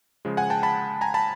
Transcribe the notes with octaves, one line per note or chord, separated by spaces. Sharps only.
C#3 F3 G#3
F#5 G#5
G5 A5
A5 B5
G#5 A#5
A5 B5